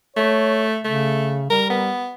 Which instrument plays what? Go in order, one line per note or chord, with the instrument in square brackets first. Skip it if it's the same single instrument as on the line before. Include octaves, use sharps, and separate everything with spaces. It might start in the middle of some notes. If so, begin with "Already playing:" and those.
[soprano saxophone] A3 [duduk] C#5
[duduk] C#3 [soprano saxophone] A3
[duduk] G3 [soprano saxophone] A#4
[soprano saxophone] B3